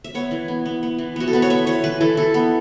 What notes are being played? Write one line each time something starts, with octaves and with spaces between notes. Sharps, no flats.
E5
B3 C#5
E3
B3
B3
B3
E3
B3 F#4
A4
B3 B4
C#5
B3 E5
E3 C#5
E3 B4
E3 A4
E3 A4
B3